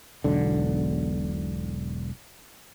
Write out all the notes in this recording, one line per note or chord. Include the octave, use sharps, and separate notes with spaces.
E1 B1 D3